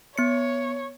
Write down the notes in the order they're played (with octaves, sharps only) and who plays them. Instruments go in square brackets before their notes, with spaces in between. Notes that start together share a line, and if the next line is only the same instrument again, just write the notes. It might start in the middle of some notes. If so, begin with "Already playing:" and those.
[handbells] B3 C#7 [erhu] C#5